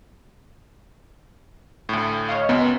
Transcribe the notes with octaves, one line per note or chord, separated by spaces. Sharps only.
D2 A2
C#5 D#5 F5
C#2 F#2 B3